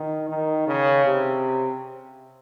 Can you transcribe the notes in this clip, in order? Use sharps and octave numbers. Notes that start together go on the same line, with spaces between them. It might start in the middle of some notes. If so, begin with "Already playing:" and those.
Already playing: D#3
D#3
C#3
C3